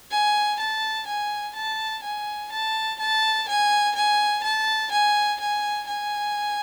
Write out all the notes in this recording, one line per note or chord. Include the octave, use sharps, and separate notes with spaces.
G#5
A5
G#5
A5
G#5
A5
A5
G#5
G#5
A5
G#5
G#5
G#5